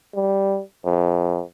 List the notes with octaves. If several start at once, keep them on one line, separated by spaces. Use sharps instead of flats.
G3
F2